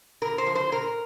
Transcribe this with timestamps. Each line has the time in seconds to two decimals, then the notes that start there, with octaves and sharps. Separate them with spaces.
0.22 A#2 A#4
0.38 C5
0.47 F3
0.55 C5
0.72 A#2 A#4